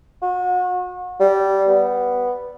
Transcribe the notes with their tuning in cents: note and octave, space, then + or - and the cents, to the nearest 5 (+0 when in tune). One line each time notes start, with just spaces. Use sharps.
F#4 -35
G3 -15
B3 +0